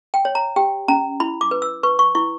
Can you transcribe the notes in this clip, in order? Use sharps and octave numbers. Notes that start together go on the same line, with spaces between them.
G5
C#5
A#5
G4 G5
C#4 A#5
E4 B5
D6
B4
E6
B4 C#6
C#6
E4 C#6